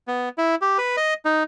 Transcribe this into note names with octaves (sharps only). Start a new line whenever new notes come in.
B3
E4
G4
B4
D#5
D#4